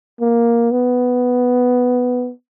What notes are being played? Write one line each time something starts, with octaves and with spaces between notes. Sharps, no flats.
A#3
B3